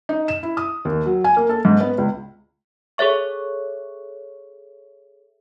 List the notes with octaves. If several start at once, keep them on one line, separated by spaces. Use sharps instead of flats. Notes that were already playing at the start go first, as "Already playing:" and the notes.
D#4
E7
E4
D#6
D#2
F#3
G#5
A#3
A4
G#2
B3
C#2
G#4 A4 C#5 E5 C#6